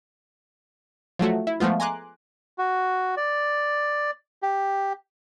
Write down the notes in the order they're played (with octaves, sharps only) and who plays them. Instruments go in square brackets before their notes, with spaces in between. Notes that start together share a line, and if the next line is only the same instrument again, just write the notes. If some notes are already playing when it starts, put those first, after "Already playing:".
[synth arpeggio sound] F3 F#3 A3 F#4
E4
F3 G#3 A3 B3 F4
G#5 A#5 C6 D6 F#6
[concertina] F#4
D5
G4